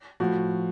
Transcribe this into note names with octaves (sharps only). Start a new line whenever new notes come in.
A2 F3 F#4